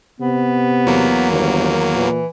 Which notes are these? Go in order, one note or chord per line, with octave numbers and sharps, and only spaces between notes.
C3 B3
E2 F#3 A#3
G1 D#3
A#2 E3